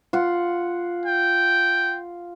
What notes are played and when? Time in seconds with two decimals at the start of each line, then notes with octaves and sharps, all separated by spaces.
0.13 F4 F#5
1.06 G5